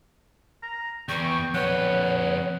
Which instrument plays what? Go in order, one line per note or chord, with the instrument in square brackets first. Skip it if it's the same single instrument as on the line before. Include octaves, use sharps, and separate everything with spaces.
[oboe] A#5
[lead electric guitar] E2 [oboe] G5 [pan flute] C#6
[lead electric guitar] F2 B4 [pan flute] C#5 [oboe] F#5